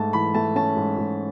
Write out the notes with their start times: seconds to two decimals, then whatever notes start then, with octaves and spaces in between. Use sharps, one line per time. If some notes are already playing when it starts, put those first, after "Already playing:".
Already playing: G#2 A3 A5
0.13 E3 B5
0.34 A3 A5
0.55 C#4 A5
0.76 G#2
0.98 G#2